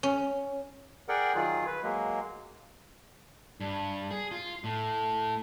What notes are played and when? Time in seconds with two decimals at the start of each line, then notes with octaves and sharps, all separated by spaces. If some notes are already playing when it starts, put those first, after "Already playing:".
0.03 C#4
1.09 G#4 A#4 D5 F#5 G5
1.35 D#3 F#3 F4 G#4
1.67 B4
1.83 F#3 G#3 A#3
3.60 G2
4.11 G#4
4.31 F4
4.64 A2